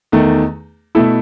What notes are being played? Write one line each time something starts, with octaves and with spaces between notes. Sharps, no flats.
E2 D#3 A3
B2 A3 E4 A4